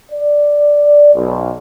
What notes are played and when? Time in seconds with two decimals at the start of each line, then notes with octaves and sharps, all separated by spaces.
0.11 D5
1.14 B1